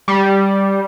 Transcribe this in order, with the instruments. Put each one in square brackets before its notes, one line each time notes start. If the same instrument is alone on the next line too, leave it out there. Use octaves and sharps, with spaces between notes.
[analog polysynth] G3